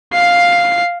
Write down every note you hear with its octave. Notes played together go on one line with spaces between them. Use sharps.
F5 C7